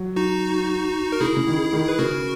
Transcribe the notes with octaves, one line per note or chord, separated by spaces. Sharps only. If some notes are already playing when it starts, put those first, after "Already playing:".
Already playing: F#3
D#4 F#4
A#4
C#3 E4 G#4
C#3
D#3
D#3
B4
C#3 F#4 A#4